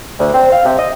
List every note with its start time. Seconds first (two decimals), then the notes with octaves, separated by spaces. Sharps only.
0.19 D2
0.34 C4
0.52 F5
0.65 C3
0.78 D#5